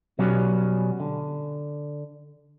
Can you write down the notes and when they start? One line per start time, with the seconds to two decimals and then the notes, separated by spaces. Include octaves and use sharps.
0.19 B2 F#3 G3 B3 C#4
1.00 D3